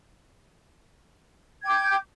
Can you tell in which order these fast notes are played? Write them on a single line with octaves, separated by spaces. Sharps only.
G#6 G5 D6 G6